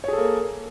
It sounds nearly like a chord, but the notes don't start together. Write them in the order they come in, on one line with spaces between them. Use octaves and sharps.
C#5 G#4 A4 A#3